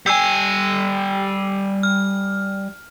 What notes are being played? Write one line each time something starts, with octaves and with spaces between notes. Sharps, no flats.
G3 G5 G#5 E6
F6